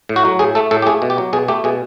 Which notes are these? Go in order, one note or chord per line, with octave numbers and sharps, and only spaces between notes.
A2
F#4
F#3
A2 G#4
A3 A4
A2 A4
G4
A3 G#4
B2
G4
F#3
B2 G#4
A3 G4
B2 G#4